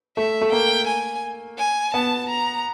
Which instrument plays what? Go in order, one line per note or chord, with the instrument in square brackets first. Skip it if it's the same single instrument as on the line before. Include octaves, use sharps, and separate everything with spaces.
[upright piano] A3 [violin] E5
[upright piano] A3
[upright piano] A#3 [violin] G5
[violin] G#5
G#5
[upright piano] B3 [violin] A5
[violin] A#5